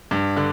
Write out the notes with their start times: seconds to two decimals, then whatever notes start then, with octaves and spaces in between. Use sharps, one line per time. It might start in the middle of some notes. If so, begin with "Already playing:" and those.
0.11 G2
0.37 D3